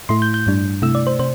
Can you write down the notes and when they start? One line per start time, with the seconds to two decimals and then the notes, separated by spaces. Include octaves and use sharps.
0.09 A2 A3 E4 C6
0.22 G6
0.34 G6
0.46 G2 G3 D4
0.82 C3 A3 E4 E6
0.95 D5
1.07 C5
1.19 C3 C5